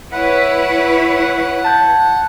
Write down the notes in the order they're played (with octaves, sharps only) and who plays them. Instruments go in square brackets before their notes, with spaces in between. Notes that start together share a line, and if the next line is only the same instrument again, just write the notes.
[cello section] E4 B4 C#5 [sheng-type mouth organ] F#5 [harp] B5
[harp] A5 G6 G#6